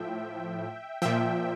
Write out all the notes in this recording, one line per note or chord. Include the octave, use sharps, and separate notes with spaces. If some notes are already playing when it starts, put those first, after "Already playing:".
Already playing: A2 F3 E5 G5
A#2 F3 E5 G5